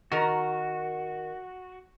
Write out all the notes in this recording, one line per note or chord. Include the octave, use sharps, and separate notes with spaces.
D#3 F#4 A#4